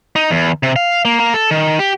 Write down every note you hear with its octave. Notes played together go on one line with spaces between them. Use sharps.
D#4
E2
C3
F5
A#3
A#3
A4
D#3
G4